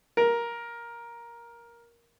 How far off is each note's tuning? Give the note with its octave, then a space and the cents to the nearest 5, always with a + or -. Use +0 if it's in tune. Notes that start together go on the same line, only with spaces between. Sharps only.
A#4 +10